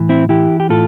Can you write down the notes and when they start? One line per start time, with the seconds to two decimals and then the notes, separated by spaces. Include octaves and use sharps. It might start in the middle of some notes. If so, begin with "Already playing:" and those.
Already playing: A2 E3
0.09 C4 E4
0.29 E3 E4 G4
0.60 G4
0.70 A2 F4 A4